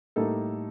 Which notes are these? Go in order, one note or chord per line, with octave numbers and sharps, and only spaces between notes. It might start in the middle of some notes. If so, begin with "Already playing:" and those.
A2 G3 A#3 D#4 A4